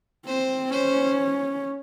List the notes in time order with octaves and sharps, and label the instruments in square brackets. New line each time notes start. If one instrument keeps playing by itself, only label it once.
[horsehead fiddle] C4 [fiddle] C5
[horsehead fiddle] C#4 [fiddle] C5